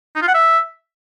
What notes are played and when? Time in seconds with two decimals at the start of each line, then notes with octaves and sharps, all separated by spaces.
0.16 D#4
0.22 F4
0.28 F#5
0.34 E5